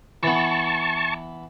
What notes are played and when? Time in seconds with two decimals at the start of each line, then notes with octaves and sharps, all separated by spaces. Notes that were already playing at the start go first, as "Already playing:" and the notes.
0.23 E3 B3 A5 C#6